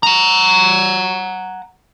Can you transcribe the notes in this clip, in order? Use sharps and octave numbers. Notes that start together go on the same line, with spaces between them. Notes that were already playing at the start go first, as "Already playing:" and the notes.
F#5 A#5